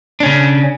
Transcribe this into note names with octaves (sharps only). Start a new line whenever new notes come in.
C#3 C#4 D4